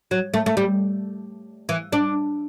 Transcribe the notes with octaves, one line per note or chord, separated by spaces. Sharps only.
F#3
A3
A3
G3
E3
D4